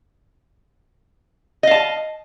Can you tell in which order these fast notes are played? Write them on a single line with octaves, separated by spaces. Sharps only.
D#5 F5 A5